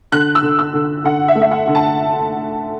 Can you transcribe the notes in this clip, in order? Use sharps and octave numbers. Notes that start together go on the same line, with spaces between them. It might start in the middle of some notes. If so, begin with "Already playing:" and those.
D3 F#6
E6
D3
E6
D3
D3 F#5
E5
A3
E5
F#5
D3
A5